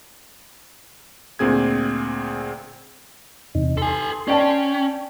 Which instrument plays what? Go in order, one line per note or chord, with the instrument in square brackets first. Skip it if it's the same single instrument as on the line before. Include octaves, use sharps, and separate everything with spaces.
[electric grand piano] D2 A#2 C4 G#4 G#6
[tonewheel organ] E2 C3 D#4
[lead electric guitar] A4 G#5 [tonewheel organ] C6
[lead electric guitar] C#4 [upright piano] D5 G5 A5